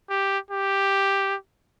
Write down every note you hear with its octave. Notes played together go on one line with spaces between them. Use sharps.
G4
G4